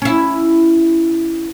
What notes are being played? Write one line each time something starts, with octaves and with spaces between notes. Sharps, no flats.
C#4 E4